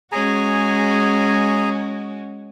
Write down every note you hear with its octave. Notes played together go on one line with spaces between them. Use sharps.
G#3 C#4 F#4 G#4 G#5 A#5